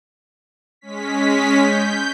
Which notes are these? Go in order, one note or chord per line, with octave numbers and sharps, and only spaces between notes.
G#3 C#4 B6
G6